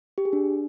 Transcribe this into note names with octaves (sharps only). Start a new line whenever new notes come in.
G4
G#4
D4